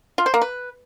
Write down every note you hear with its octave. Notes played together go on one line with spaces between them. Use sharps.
F4
C5
A#3
B4